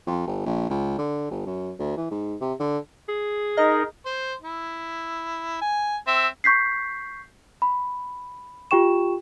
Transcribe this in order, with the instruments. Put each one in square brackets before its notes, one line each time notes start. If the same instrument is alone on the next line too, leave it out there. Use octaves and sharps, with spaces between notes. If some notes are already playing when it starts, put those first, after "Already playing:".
[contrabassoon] F2
G1
A#1
C#2
D3
G1
F#2
D2
E3
G#2
C3
D3
[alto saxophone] G#4
[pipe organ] D#4 A#4 [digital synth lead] D#5
[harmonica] C5
E4
G#5
C4 E5
[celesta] C#6 G6 B6 C7
B5
F4 G4 G5 C#6 E7